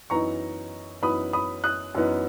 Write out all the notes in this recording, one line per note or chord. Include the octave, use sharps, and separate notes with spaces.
F#2 E3 B3 D#4 A#5 C#6
F#2 E3 B3 D#4 B5 D#6
B5 D#6
D#6 F#6
F#2 E3 B3 D#4